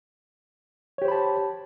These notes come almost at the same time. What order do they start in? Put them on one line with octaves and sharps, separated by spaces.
C#5 G4 C5 B5 A5